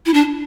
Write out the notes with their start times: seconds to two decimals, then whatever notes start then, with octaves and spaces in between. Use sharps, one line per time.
0.06 E4
0.14 D4